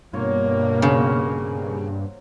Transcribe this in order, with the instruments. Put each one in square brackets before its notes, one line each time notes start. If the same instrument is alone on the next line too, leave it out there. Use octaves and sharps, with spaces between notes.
[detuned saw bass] G2 [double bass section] B2 A#3 [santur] F4 C#5
[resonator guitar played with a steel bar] C#3 [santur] F#3 C5 F5